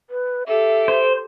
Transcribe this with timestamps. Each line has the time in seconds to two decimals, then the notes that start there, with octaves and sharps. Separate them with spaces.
0.10 B4
0.47 G4 A4 E5
0.88 C5